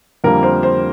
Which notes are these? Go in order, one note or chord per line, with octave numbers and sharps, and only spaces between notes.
F2 D3 G3 A#3 A#4
C5
C5